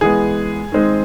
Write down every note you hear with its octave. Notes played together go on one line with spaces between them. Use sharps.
E3 G#3 B3 G#4
D#3 G#3 C4